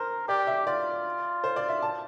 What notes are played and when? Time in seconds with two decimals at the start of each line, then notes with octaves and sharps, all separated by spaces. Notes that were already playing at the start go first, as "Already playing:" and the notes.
Already playing: A#4 C5
0.28 G4 D5
0.47 E5
0.67 F4 D5
1.44 C5
1.56 D5
1.69 E5
1.83 A5